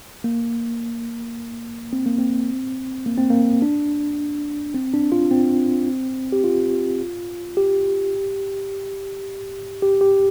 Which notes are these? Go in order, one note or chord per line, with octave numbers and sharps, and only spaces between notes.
A#3
C4
A#3
C4
A#3
C4
A#3
D4
C4
D4
F4
C4
G4
F4
G4
G4
G4